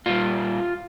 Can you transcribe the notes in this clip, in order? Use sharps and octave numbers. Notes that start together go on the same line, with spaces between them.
A#2 G3 F4